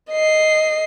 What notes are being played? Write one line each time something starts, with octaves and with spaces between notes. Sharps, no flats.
D#5 C7